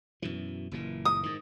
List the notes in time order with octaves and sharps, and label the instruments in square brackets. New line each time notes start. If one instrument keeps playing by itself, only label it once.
[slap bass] F#2 B2 E3
F#1 A#2 E3
[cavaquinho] D#6
[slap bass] G#2 D#3